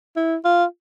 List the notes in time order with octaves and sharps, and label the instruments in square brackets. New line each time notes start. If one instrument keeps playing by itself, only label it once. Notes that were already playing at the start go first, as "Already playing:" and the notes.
[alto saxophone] E4
F4